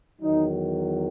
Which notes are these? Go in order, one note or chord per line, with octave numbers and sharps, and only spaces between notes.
E2 D#3 F#3 D#4